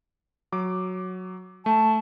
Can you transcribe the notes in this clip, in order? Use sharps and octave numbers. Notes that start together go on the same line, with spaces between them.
F#3 D6
A3 A5